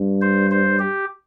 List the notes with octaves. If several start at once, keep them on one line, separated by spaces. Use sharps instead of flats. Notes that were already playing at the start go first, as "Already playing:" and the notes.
Already playing: G2
C5
C5
G4